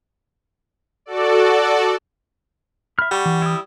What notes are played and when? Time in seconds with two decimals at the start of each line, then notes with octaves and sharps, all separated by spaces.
1.06 F#4 A4 D5
2.99 E5 B5 F6
3.11 G3 F#5 C#6
3.26 E3
3.42 E4 D#6